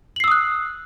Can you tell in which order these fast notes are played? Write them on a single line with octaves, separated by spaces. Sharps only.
F#7 C7 E6 D#6 F#6